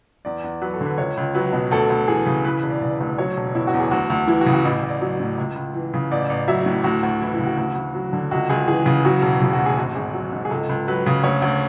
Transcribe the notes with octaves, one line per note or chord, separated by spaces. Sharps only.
E2 D5
E2
F#3 B4
A4
D3
B4
C#2 C#5
C#2
F#3 B4
B2
D2 A4
D2
E3 G#4
C#3
E3 B4
B4
E1
D5
C#3 D5
D2 D5
F#3 C#5
E1
B2 E4
F#4
E2
G#4
D2 F#4
D2
E3 E4
F#4
C#3
F#4
A1 E4
A1
D5
F#3
A2
C#2
C#2
E3
C#3
A1 D5
A1
F#3 E5
A2
D2 F#4
D2
E3 E4
E4
C#3
F#4
D2
D2
F#3
D3
C#2 F#4
C#2 G#4
E3 G#4
C#3
F#3 F#4
E1
C#3 E4
F#4
D2
G#4
G#1 F#4
G#1 G#4
F#3
G#2
G#4
C#2 A4
C#2
F#3 B4
C#3
D2 C#5
D2